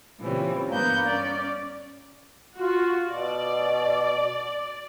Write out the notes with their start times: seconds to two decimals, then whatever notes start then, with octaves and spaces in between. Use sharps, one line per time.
0.19 A#2 C#3 E3 G3 C4 C#4
0.68 G2 A#3 B3 G6
1.02 C#4 D5
2.57 F4 F#4
3.08 B2 D5